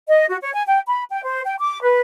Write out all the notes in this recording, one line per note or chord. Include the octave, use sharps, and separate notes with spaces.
D#5
F#4
C#5
G#5
G5
B5
G5
C5
G5
D6
B4